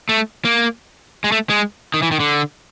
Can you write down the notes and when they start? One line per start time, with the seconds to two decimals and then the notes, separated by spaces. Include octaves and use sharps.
0.09 A3
0.45 A#3
1.24 G#3
1.32 A3
1.50 G#3
1.94 D#3
2.02 E3
2.12 D#3
2.20 D3